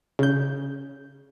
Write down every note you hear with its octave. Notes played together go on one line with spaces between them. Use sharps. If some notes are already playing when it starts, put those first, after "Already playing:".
C#3 G6